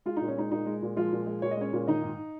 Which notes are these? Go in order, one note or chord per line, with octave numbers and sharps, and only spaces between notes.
G#3 F4
A#2 D#4
C#4
G#3 D#4
A#2 D#4
G#3
A#2
F3 G#3 F4
A#2
G#3
A#2 C#5
D#5
G#3 C#4 C#5
A#2
D#3 D#4 D#5
G#2